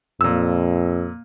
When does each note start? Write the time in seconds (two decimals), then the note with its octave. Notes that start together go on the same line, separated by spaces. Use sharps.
0.21 F2 A#2 E6